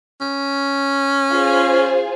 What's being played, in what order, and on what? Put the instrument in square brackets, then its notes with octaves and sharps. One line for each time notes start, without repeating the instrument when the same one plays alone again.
[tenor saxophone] C#4
[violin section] F4 G#4 C5